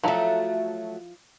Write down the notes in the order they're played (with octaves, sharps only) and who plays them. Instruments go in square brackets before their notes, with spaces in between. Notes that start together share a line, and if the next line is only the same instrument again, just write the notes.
[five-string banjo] F3 E4 A#5 [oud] F#3 A3